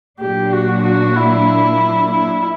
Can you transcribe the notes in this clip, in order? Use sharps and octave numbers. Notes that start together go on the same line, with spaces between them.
A#2 F#3 A#3 D4 G4
F#4
F#4
E4
E4